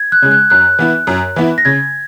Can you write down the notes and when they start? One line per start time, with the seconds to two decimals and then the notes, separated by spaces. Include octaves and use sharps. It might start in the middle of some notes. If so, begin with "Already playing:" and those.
Already playing: G#6
0.12 F#6
0.22 C#3 G#3
0.31 F#6
0.50 F#2 F#6
0.79 E3 B3 E4
1.07 F#2
1.36 E3 B3 E4
1.58 A#6
1.65 C#3 G#6